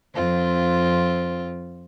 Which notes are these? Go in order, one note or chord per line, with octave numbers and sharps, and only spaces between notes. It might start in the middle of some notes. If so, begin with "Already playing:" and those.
F2 C4 F4